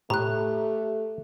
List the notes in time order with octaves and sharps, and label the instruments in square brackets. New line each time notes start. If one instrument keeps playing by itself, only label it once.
[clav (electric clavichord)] A2 [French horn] A3 [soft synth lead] G4 [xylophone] A#5 F#6